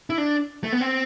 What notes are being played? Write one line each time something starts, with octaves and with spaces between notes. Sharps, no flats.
E4
D4
A3
B3
C4